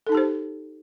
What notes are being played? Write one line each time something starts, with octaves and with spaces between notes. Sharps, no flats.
D#4 G4 A4 C5 A5